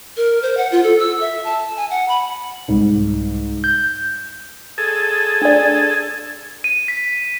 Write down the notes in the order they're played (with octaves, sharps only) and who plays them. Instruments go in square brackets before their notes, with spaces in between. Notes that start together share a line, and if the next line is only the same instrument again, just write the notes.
[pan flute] A#4
C5
F#5
F4
A4
E6
E5
A5
G#5
F#5
B5
[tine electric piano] C2 [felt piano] G#2
[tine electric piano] G6
[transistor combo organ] G#4 A4
[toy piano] D4 D5
[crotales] D#7
B6